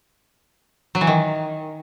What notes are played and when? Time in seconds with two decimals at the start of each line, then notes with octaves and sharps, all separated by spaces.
0.95 F#3
1.01 E3
1.07 D#3